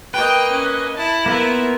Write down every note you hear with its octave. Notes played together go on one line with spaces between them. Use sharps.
A#3 B4 D#5 G5
C#4
E4 A5
A#3 B3 F4 A#4 E5